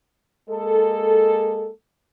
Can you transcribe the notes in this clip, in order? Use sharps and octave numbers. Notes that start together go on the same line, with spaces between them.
G#3 A#3 A4